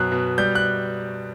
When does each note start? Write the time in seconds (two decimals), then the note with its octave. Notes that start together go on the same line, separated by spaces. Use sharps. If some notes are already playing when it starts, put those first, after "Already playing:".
Already playing: F#2 B2 F#6
0.12 B2
0.38 G3 G6
0.55 F#6